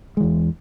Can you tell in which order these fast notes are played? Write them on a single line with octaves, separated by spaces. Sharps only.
G#3 E3 E2